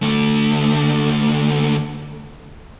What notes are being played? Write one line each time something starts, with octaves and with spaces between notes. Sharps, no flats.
D2 A3